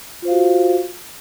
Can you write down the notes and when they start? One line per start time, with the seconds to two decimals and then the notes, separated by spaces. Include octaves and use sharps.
0.22 F4
0.25 C5
0.28 F5
0.31 F#4